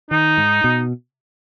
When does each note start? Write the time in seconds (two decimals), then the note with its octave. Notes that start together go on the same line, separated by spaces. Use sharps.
0.10 D#3 D#4
0.38 G#2
0.64 B2